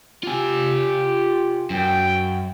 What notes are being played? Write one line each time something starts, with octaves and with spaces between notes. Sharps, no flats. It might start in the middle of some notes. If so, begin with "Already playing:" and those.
F4 G4 G#5
F#2 G5